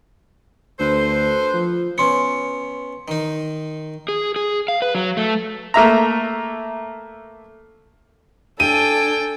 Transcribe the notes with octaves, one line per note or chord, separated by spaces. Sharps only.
D2 A4 B4 C5
F3
B3 C#4 C6 C#7
D#3 D#4
G#4
G#4
F5
B4
F#3
A3
A3 A#3 E5 A#5
D4 A4 G5 G#5 D#7